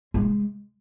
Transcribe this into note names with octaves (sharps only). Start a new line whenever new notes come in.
G#3